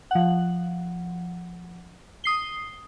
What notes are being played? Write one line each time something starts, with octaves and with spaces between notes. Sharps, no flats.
F3 F#5
D#6 C7 G7